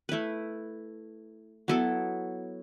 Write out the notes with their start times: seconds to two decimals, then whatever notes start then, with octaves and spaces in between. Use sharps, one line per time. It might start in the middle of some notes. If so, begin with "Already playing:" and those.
0.09 A3 E4 B4
1.68 F#3 B3 E4 A4